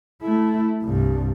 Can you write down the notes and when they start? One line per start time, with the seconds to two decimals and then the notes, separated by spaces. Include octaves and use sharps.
0.22 A3 E4
0.83 C2 G2